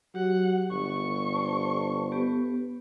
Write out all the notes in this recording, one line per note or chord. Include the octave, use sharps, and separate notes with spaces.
F#3 G4 F#5
G1 C#6
C5 A5
B3 G4 B4